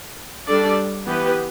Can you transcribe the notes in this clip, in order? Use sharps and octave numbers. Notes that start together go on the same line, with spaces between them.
G3 D4 A4 D5
E3 B3 G4 B4